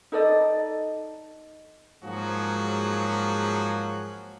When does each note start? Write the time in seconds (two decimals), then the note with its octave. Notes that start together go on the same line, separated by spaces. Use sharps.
0.12 D#4 A4 D5 D#5
2.04 G#2 F3 F#3 A#3 F#4 G#4